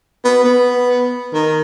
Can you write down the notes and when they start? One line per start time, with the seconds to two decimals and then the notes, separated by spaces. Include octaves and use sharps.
0.24 B3
0.44 B3
1.34 D#3